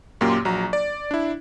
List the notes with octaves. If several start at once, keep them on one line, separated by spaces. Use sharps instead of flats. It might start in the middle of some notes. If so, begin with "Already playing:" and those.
F#2 A#2 A#3 G4 C6 D6
A#1 F#3 A#5
D5
D4 E4